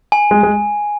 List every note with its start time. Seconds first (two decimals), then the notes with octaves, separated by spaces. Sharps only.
0.12 G#5
0.31 G#3
0.43 G#3